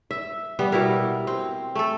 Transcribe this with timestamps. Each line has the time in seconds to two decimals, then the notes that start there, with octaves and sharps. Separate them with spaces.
0.11 E5
0.59 G3 B3
0.72 B2 G3 E4 A#4
1.27 C4
1.75 A3 A4